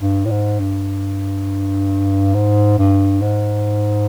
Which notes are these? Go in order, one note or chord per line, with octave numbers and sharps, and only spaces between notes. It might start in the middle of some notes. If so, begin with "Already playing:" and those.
G2
A2
G#2
G2
G#2
G2
G#2